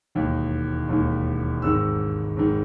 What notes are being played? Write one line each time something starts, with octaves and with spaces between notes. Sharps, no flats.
E1 D#2 D#3
E1 D#2 D#3
G#1 G#2 D#3 E6
G#1 G#2 D#3